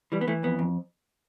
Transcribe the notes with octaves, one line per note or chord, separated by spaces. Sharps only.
E3 G3
B3
E3 A3
F2 B3
F2